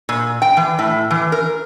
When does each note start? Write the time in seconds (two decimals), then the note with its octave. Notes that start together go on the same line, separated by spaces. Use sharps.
0.09 A#2
0.42 G5
0.57 E3
0.79 A2
1.11 E3
1.32 A#4